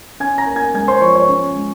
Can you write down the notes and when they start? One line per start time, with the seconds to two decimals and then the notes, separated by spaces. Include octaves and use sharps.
0.20 C#4 G#5 G#6
0.38 A#5 A#6
0.47 A#3
0.56 G#5 G#6
0.74 G#3 G#5 G#6
0.88 C5 C6
1.01 F3 C#5 C#6
1.15 C#5 C#6
1.29 C#4
1.56 G#3